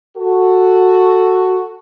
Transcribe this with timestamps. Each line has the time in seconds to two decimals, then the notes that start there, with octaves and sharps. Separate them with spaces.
0.17 F#4 A4